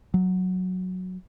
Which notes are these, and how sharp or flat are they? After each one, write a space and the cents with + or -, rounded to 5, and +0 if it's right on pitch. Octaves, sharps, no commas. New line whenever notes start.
F#3 -5